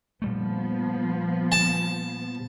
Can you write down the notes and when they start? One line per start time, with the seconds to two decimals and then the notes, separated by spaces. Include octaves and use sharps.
0.22 A#2 F3 G3 A3 B3
1.52 A5